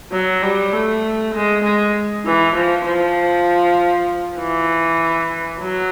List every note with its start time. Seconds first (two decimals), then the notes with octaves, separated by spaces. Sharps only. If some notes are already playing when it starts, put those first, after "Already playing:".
0.12 F#3
0.43 G3
0.73 A3
1.34 G#3
1.64 G#3
2.25 E3
2.55 F3
2.86 F3
4.39 E3
5.60 F#3